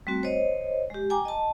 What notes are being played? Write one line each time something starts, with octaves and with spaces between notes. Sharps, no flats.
G3 A3 C4 F#4
C5 C#5 D#5
G#3 G4
G5 G#5 A#5 D6
D#5 A5